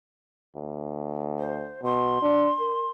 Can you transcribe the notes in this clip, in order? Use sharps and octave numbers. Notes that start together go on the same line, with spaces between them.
D2
C5
B2 C6
D4
A#4